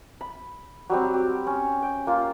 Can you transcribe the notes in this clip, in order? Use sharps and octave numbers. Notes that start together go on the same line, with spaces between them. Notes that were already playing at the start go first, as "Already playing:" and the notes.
B5
F#3 G3 C4
G4
C#4
G5
A#3 F4